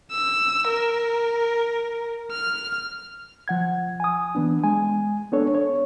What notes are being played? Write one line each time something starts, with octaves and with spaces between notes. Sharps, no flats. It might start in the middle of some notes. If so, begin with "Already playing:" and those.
E6
A#4
F6
F3 F#5 G#6
G#5 D#6
E3 B3 D4
G#3 G#5
B3 D4 A4 C#5
C#5